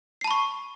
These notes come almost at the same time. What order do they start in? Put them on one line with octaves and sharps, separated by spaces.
C7 A5 B5 C#6